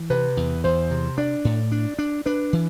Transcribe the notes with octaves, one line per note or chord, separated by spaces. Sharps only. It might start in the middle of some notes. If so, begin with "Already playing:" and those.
Already playing: E3
C3 B4
E2
E2 C5
C3
D4 D5
A2
D4
D4
D4 B4
E3